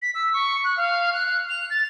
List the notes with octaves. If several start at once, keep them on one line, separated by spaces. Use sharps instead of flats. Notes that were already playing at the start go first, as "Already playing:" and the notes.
B6
E6
C#6
F#6
F5
F#6
F7
A6